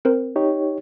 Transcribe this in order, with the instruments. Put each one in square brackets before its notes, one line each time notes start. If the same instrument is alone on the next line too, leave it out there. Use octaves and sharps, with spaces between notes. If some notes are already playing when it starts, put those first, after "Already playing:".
[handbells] C4 A#4 C5
[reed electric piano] D#4 G4 C#5